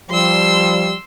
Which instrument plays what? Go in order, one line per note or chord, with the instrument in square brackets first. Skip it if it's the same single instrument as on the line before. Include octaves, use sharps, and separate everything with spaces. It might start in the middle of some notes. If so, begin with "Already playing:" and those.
[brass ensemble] F3 G3 [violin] C6 E6